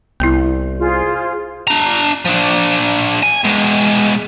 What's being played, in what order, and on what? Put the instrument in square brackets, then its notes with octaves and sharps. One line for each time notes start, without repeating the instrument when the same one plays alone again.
[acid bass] C2 [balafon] B3 E4
[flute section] F4 G#4 C5
[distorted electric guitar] D4 A#5
F3 D4
G#5
B2 G#3